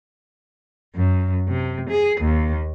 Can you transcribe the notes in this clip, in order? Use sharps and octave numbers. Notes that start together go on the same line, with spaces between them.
F#2
C3
G#4
D#2